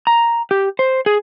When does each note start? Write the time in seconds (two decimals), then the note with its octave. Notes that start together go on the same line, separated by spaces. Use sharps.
0.07 A#5
0.51 G4
0.79 C5
1.06 G#4